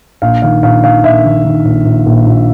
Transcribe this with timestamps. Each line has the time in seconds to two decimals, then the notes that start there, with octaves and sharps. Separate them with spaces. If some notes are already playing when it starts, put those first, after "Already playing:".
0.22 A#1 F5
0.42 D#3 F5
0.63 A#1 F5
0.84 D#3 F5
1.04 A#1 E5
1.25 D#3
1.45 D#3
1.65 A#1
1.85 A#1
2.06 A#1
2.26 A#1